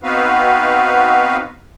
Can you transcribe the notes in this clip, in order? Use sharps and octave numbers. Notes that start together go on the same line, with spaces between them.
B3 C4 D#4 F#4 B4 F5